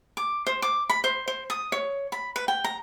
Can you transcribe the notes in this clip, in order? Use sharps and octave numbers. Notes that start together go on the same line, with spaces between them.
D6
C5
D6
B5
C5
C5
D#6
C#5
B5
B4
G5
A#5